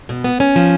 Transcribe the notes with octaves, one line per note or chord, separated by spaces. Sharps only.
B2
B3
C#4
F3